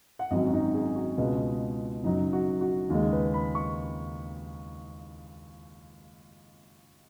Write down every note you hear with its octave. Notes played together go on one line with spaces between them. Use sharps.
F#5
G#1 F#2 F#3 D#5
F#4
D#4
G#4
F#4
C#2 B2 G#3
F#1 F#2 F#3 D#4
F#4
F#4
D#2 C#3 G#3
G#4
B4
B5
C#6